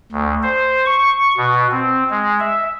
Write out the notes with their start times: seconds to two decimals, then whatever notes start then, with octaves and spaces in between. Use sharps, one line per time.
0.12 D2
0.43 C5
0.86 C#6
1.37 B2
1.72 C4
2.10 G#3
2.40 E5